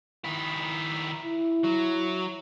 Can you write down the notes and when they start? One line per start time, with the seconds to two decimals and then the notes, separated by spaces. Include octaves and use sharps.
0.24 D#3 E4
1.25 E4
1.64 F#3